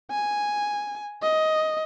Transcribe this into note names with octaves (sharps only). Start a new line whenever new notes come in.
G#5
D#5